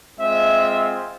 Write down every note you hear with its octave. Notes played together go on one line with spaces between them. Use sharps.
G#3 C4 F4 E5